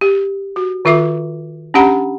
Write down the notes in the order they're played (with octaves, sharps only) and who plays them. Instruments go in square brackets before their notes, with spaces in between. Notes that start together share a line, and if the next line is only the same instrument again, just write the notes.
[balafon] G4
F#4
D#3 F4 A4 E5 D6
C#4 D4 G4 F#5 A#5 B5